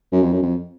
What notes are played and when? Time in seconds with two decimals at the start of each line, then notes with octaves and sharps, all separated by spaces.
0.12 F#2
0.23 F2
0.33 F#2
0.42 F2